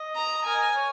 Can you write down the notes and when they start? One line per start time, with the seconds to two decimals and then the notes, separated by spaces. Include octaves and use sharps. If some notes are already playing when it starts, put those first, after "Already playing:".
Already playing: D#5
0.15 A#5
0.45 A#4 G#5
0.75 C#5